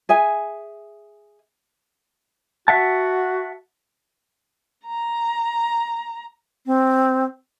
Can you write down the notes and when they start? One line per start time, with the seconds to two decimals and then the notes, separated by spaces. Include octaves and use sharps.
0.09 G#4 E5 G#5
2.68 F#4 E5 F#5 A5
4.86 A#5
6.66 C4